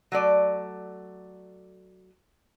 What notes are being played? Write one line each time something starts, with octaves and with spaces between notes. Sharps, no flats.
F#3 A3 D5